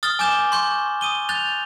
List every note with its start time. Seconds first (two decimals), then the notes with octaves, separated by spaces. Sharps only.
0.03 D#6 F6 A6 G7
0.19 G#5 D6 D#6 G6 E7 G7
0.52 C6 C#6 G6
1.01 D#6 D#7 G7
1.29 F#6 G6 A6 F7